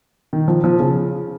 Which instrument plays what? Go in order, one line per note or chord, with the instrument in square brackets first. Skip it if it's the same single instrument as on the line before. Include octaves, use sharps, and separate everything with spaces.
[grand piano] D#3
F3
F3
C#3